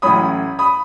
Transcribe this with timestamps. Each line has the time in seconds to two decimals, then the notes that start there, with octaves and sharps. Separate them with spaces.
0.02 A1 A2 F#3 C#4 B5 D#6
0.59 B5 D#6